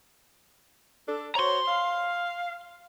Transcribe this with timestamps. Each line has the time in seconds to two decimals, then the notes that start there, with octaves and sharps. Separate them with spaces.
1.06 D4 A4
1.35 F#4 C5 C#5 A#5 C6
1.67 F5